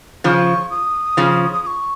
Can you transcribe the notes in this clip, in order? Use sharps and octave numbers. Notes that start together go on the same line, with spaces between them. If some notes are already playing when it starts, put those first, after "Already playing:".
C#3 F3 C#6 D#6
D#6
C#3 F3
D#6
D#6
C#6